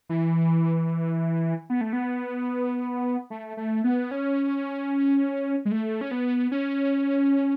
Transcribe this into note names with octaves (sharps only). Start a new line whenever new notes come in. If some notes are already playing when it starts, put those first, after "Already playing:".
E3
B3
A3
B3
A3
A3
B3
C#4
G#3
A3
C#4
B3
C#4